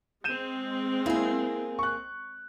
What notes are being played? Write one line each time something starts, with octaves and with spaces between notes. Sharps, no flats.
G#3 C4 G6 D#7 E7
A#3 E4 G#4
C#6 F#6